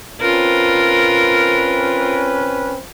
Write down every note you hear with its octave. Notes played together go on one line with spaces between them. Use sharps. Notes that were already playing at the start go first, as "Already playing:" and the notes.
C4 C#4 F4 A#4 B4